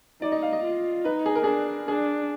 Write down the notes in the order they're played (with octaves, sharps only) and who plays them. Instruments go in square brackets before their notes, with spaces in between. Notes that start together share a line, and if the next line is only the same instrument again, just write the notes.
[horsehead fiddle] D#4 [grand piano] D5
[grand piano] D#5
F5
D#5
[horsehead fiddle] F4
[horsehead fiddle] D#4 [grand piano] B4
[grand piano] G#4
A#4
[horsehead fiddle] D4 [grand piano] G#4
[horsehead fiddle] D4 [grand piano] G#4